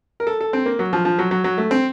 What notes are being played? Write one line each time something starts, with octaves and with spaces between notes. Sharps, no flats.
A#4
A4
A4
C4
A#3
F#3
F3
F3
F#3
F#3
F#3
A3
C4